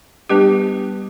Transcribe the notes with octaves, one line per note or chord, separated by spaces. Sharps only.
G3 B3 D4 G4 B4